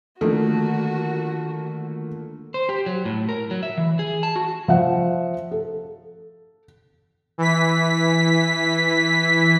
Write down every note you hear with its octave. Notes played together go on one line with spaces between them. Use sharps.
D3 D#3 F3 A3 A#3 F#4
C5
G4
F#3
A2
A#4
F#3
E5
E3
G#4
A5
F#4
F3 E5 F#5
A4
E3 B6